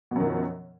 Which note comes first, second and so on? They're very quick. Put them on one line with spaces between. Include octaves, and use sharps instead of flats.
B2 F#2 D#3 F3